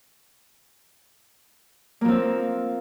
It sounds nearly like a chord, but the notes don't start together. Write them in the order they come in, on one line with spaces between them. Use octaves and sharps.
A#3 F3 C4